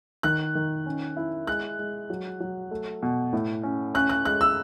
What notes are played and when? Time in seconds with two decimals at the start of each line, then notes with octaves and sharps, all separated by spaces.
0.23 D#3 F#6
0.55 D#3
0.86 C#4
1.16 E4
1.47 G#3 F#6
1.79 G#3
2.10 F#3
2.40 F#3
2.71 A3
3.03 B2
3.33 A2
3.63 C#4
3.95 C#4 F#6
4.09 F#6
4.25 G#3 F#6
4.41 E6